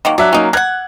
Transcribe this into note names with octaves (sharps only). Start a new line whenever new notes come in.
D#3 F#3 A#3
F#3 D4 E5 F#6
F#3 A#3 C#4 D#4
A#4 F#5 F#6 G#6